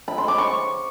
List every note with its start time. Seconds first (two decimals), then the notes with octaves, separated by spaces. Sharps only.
0.08 B5
0.18 C6
0.28 D6
0.38 C#6